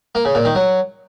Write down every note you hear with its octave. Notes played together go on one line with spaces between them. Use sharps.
A#3
C#3
A#2
D#3
F#3